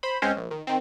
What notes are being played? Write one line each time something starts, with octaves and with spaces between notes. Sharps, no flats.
C5 B5
C#2 G#3 C4 C#4 C5
A#1
D#3
D#3 C4